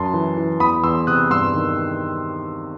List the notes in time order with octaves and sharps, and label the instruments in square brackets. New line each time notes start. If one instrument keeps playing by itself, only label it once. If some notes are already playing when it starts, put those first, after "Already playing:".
Already playing: [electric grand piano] F#2 A5 C6
E3
E3
E2 B5 D#6
E2 C6 E6
C3 D#6 F#6
G2 C6 E6
D#3